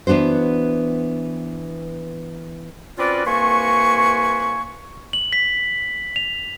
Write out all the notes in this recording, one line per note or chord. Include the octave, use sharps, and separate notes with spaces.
E3 B3 D4 F#4 C5
C4 C#4 F4 F#4 B4 D5
C2 A#3 B4 G#5 C6 C#6
F#7
B6
F7